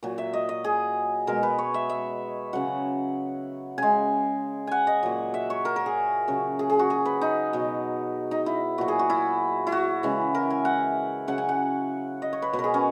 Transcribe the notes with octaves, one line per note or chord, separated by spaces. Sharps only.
A#2 F#3
E5
D#5
D#5
G#4
B2 G#3 A#4
B4
C#5
E5
E5
C#3 F#3 F#5
C#3 G#3 G#5
F#5 G#5
D#5
A#2 F#3
E5
C#5
A#4
A#4
G#4
C#3 F#3
G#4
G#4
F#4
G#4
B4
D#4
B2 F#3
D#4
E4
A#2 F#3 F#4
G#4
F#4
E4
E4
F#4
C#3 E3 G#3
A#4
G#5
F#5
C#3 F#3 F#5
G#5
F#5
D#5
C#5
B4
B2 F#3 B4
A#4
G#4
C#4